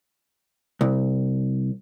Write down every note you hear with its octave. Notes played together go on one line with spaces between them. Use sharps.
C2